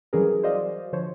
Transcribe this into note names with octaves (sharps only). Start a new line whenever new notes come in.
E3 F#3 G3 C#4 G#4 A#4
F#4 C5 D5 D#5 F5
D3 F3 C5 C#5